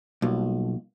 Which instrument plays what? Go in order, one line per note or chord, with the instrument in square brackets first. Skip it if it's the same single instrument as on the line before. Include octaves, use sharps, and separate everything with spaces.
[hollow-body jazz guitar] B1 [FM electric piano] G3 A#3 F4